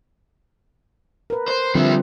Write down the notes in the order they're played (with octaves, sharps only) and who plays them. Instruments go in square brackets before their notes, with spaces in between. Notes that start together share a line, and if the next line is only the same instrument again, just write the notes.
[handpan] A#4 B4
[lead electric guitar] C5
[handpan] D3 F3 C4 [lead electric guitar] G3 E4